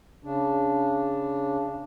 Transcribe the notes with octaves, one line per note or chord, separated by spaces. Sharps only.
C#3 D4